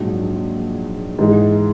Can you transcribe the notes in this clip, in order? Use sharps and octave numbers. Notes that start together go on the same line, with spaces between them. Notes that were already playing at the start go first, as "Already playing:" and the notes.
Already playing: A#1 G#2 F#3
G#2 E3 G#3